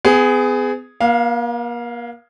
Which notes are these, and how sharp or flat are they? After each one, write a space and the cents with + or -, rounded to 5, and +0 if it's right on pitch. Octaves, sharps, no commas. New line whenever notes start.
B3 +35 G#4 +0
A#3 +40 F5 -5